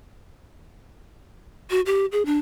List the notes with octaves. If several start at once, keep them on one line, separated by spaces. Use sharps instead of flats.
F#4
G4
G#4
D4